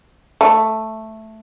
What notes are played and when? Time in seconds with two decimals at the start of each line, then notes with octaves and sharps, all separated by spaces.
0.41 A3